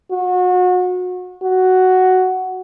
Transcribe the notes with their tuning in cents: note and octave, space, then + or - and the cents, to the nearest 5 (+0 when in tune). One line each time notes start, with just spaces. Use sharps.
F#4 -30
F#4 +5